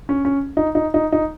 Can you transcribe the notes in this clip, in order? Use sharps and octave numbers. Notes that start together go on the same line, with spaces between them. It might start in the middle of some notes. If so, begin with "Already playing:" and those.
C#4
C#4
D#4
D#4
D#4
D#4